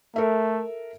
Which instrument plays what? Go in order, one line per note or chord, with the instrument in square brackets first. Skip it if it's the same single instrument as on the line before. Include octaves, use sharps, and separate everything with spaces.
[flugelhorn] A3 [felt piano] A4 A#4 E5